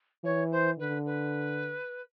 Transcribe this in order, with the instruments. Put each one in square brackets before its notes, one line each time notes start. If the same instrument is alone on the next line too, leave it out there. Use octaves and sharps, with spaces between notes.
[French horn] E3 [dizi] C#5
[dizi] C5
[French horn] D3 [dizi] B4
[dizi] B4